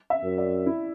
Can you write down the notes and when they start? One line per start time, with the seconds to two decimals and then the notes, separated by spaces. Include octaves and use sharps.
0.10 E5
0.24 F#2
0.38 D5
0.67 E4